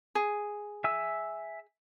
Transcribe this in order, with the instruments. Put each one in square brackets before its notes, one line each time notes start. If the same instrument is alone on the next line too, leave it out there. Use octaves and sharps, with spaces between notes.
[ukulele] G#4
[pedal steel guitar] E5 G#5 E6